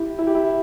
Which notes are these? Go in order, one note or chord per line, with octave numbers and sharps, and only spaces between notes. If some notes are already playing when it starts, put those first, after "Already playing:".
Already playing: E4 G4
E4
G4
E4